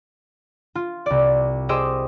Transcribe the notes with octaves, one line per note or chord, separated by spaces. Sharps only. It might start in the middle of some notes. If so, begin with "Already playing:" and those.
F4
C2 D5
G4 G#4 C5 D#5 D6 E6